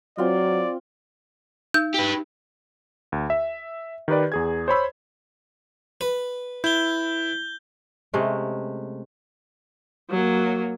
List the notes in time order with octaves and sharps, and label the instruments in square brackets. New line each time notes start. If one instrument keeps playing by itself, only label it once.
[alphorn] F#3 [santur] C4 F4 [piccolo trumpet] D5
[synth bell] D#4 [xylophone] G6
[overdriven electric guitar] G4 B4
[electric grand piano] D2
E5
D#3 G4 B4 D5
E2 G#4 G#6
C5 C#5 B5 E6
[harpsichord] B4
[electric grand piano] E4 [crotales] G6 G7
[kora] C3 G#3 A3 C#4
[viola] F#3 A#3